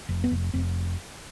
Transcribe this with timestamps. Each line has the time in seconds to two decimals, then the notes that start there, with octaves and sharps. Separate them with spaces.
0.09 F1
0.24 B3
0.31 F1
0.53 F1 C4